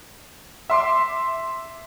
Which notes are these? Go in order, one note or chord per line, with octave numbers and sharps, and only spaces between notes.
E5 C6 D6